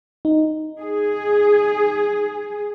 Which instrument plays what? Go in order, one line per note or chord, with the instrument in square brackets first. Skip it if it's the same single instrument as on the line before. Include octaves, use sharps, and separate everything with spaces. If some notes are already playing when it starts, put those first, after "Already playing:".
[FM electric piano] D#4
[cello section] G#4